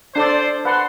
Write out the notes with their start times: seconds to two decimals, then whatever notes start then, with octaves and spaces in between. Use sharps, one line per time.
0.15 D4 A4 C5 D5
0.65 B4 F#5 A5 C6